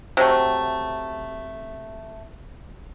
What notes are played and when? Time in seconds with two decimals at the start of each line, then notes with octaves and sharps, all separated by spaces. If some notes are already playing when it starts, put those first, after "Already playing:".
0.17 C3 F#3 A3